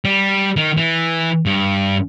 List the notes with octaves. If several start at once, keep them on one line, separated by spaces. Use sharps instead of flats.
G3
D#3
E3
G2